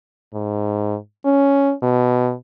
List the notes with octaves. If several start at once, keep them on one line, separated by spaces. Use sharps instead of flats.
G#2
C#4
B2